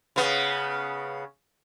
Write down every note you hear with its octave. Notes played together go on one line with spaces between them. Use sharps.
C#3 B3